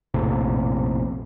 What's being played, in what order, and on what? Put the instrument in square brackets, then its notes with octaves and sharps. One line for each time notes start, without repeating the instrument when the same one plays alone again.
[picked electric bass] A#1 F2 A2 C3